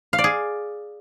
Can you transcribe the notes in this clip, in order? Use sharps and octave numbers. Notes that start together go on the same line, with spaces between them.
F5
D5
G#4